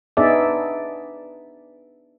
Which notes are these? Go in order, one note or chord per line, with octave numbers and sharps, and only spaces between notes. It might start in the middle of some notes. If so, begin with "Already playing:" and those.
B3 D4 D#4 G#4 D5 E5